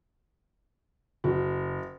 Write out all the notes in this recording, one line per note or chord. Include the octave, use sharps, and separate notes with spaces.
F#1 F#4